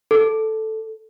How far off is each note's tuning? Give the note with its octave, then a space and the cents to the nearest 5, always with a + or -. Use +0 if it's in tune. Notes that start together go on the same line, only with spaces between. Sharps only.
A4 +0